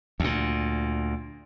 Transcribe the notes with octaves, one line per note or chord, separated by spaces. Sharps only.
D2 A#2